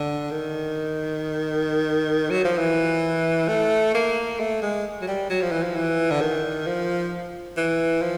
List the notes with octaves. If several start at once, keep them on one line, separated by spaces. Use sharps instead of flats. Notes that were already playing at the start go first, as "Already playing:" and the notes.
Already playing: D3
D#3
F#3
F3
E3
A3
A#3
A3
G#3
F#3
G3
F#3
F3
E3
F3
E3
D3
D#3
F3
E3
F3